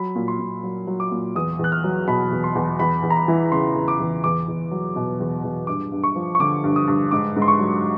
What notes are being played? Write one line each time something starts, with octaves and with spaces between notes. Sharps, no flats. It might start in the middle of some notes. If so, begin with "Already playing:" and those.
Already playing: F#3 B5
A#2
C6
A#2
F#3
F#3
D6
A#2
E2 D#6
E2 F#6
F6
F#3
B2 B5
E2
C6
E2
E2 B5
E2
A#5
B5
E3
C#3 C6
E2
D6
E2
E2 D6
E2
F#3
B2
E2
E2
G2 D6
G2
C#6
F3
C#6
D3 D6
G2
D#6
G2
G#2 D6
G#2
C6
C#6
F#3